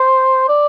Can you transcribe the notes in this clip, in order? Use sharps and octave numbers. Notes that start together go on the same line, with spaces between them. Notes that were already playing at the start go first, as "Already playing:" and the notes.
Already playing: C5
D5